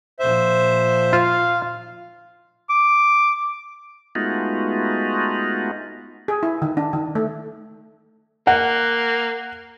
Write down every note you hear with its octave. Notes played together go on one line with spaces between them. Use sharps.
A#2 F3 C5 E5
F4 F5
D6
G#3 A3 B3 D#4 F4 F#4
G#4
E4
D#3
D4
D#3
A3
A#3 F#5